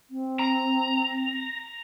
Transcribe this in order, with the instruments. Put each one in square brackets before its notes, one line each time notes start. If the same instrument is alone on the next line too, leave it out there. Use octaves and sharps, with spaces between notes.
[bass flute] C4
[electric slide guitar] A#5